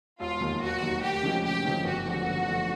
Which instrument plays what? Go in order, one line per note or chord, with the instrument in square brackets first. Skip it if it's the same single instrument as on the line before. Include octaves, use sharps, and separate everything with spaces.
[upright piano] E1 [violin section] F4
[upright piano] D#2 D#3 F#3
[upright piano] E1 [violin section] F#4
[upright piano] D#2 D#3 F#3
[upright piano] D2 [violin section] G4
[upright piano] C#3 F3 G#3 C#4
[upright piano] D2 [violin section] G4
[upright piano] C#3 F3 G#3 C#4
[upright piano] G1 [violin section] F#4
[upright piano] F#2 D3 F3 A3
G1
F#2 D3 F3 A3